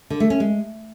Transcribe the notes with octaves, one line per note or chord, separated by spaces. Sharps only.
D3
A3
C#4
G#3